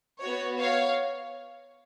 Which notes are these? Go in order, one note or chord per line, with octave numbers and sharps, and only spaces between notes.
F#4 C#5
B3
C#5 F5